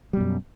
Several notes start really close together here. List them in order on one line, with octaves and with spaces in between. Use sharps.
G3 B2 F#2